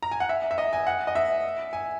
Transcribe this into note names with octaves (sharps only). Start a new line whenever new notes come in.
A#5
G#5
F#5
E5
E5
D#5
G#5
F#5
D#5
E5
G#5